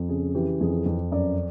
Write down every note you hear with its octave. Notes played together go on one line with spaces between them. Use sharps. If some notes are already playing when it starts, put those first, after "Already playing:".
Already playing: F2
C#3 G#4
E3 G4
F2 G#4
F2
F#2 D5